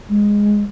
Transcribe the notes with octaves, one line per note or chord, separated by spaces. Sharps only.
G#3